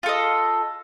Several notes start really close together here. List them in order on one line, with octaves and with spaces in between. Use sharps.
F4 A4 D#5